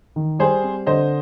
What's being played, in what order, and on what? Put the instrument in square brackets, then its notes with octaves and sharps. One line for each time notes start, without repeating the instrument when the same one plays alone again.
[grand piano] D#3
[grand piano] G3 [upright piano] G#4 C5
[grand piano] C4
[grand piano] D3 [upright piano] C5 D#5